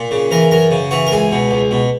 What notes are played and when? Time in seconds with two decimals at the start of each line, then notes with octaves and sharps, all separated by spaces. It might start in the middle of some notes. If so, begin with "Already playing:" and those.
Already playing: A#2
0.11 C#3
0.31 E3 A#4
0.51 F#2 A#4
0.71 C#3
0.91 E3 F#4
1.07 A#4
1.12 C#2 G#4
1.32 B2
1.51 C#2
1.71 B2